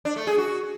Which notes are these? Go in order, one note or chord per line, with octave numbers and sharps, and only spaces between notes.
D4
A3
G#4
F#4